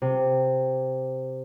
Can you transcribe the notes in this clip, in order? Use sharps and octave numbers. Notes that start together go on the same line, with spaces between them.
C3